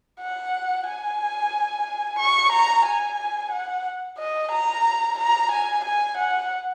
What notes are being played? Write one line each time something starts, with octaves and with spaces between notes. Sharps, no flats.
F#5
G#5
C#6
A#5
G#5
F#5
D#5
A#5
A#5
G#5
G#5
F#5